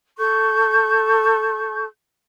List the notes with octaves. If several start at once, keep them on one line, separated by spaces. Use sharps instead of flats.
A4 C#6 G6